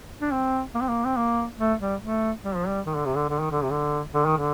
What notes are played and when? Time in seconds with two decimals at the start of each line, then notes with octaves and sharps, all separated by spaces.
0.21 D4
0.32 C4
0.74 A#3
0.81 C4
0.88 A#3
1.05 C4
1.16 A#3
1.59 A3
1.80 G3
2.01 A3
2.44 G3
2.56 F3
2.68 G3
2.86 D#3
2.96 D3
3.05 C3
3.16 D3
3.29 D3
3.39 D#3
3.51 D3
3.63 C3
3.71 D3
4.14 D3
4.25 D#3
4.38 D3